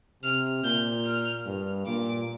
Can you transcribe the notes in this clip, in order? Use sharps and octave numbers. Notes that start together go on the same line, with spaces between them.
C3 F6
A#2 G6
F6
G2
A#2 D6